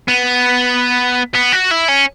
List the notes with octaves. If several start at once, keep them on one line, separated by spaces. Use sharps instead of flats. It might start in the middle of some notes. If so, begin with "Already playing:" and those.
B3
B3
F#4
E4
C#4